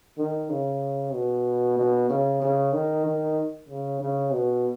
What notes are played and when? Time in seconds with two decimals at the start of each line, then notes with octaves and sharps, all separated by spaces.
0.18 D#3
0.50 C#3
1.14 B2
1.78 B2
2.10 C#3
2.42 C#3
2.73 D#3
3.05 D#3
3.69 C#3
4.01 C#3
4.33 B2